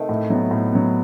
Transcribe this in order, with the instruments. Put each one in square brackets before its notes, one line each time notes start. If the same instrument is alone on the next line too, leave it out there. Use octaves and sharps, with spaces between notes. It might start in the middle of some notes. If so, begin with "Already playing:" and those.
Already playing: [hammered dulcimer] C3 D#3 A3
[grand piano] A2
F#3 B3
A2
F#3 B3